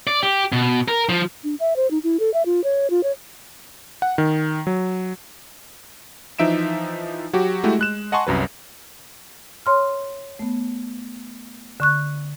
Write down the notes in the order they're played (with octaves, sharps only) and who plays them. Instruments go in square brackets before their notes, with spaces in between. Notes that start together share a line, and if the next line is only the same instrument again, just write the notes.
[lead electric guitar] D5
G4
B2
A#4
F3
[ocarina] D4
E5
C5
D#4
E4
A4
E5
F4
C#5
F4
C#5
[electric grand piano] F#5
D#3
F#3
E3 F3 D#4 E5 D7 E7
F#3 F#4 G4
G#3 A3 E4 F#4 G4
G#3 F#6 E7
D#5 F#5 G#5 A5 C6 C#6
C2 F#2 F#3 B4
[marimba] C#5 C6 F6
A3 B3
D3 C#6 F#6